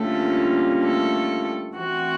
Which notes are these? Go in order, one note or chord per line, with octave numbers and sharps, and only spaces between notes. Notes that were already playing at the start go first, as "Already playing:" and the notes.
Already playing: D3 G3 A3 A#3 C#4 F4 A4
A3 A4
E3 A3 C4 F#4